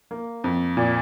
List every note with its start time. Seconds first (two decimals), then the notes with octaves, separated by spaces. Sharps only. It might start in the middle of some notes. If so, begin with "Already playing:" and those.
0.11 A#3
0.44 F2
0.77 A#2